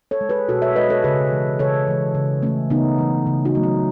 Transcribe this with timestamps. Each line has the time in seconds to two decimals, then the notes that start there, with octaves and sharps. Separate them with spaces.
0.11 A4 C#5
0.21 G#3
0.29 G#4 B4
0.48 B2 F#4 A4
0.62 C#5 E5
0.76 G#3 B4 D#5
0.90 A4 C#5
1.04 C#3 G#4 B4
1.31 E3 G#3
1.59 C#3 A4 C#5
1.88 E3 G#3
2.15 C#3
2.42 E3 A3 C#4
2.70 C#3 B3 D#4
2.98 E3 A3
3.27 C#3
3.45 D#4 F#4
3.55 F#3 A3
3.63 C#4